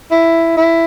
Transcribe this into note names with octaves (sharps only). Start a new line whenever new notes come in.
E4
E4